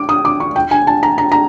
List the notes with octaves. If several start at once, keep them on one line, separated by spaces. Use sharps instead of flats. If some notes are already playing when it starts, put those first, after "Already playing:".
Already playing: D6
D#6
D6
C#6
G5
G#5
A5
A#5
A#5
A#5